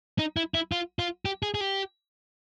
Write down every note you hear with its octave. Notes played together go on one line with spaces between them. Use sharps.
D#4
E4
E4
F4
F4
G4
G#4
G#4
G4